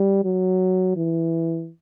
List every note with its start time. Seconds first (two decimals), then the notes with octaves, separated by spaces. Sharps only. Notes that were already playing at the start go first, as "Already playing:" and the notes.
Already playing: G3
0.24 F#3
0.96 E3